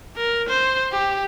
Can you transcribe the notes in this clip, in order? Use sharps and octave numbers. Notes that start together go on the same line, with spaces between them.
A#4
C5
G4